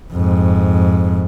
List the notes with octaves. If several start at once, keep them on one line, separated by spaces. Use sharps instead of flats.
F2 G#2